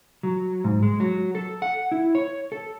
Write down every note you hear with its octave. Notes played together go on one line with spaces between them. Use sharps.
F#3
G#2
G#3
F#3
A4
F#5
E4
C#5
A4